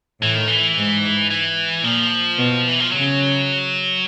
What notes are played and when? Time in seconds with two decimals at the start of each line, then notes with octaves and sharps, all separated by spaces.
0.22 A2 E3
0.35 D#3
0.48 E3
0.76 G#2
1.31 E3
1.84 A#2 F3
2.38 B2
2.68 E3
2.80 F3
2.92 C#3 F#3